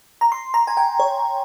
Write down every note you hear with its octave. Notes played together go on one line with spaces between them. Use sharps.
A#5
C6
A#5
G#5
G5
C#5